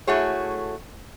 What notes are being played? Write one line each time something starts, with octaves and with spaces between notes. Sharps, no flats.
A3 E4 F#4 G#4 C#5